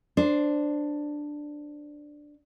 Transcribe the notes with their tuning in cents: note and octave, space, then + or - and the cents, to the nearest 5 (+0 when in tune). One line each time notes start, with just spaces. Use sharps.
D4 +5 C5 +0